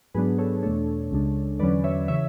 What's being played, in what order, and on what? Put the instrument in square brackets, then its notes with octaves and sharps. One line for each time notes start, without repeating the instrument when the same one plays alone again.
[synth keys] G#2 F#3 B3 D4 G#4 B4
A4 C#5
E2 B2 A3 D4 A4 C#5
C#2 C#3 G#3 D4
E2 D3 F#3 C#4 B4 D5
C#5 E5
C#3 E3 C#5 E5